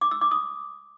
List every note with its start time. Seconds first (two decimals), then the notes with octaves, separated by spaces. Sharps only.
0.01 D6
0.11 E6
0.21 D6
0.31 D#6